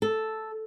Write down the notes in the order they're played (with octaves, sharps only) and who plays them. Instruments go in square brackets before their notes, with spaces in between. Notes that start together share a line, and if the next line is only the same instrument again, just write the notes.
[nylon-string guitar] A4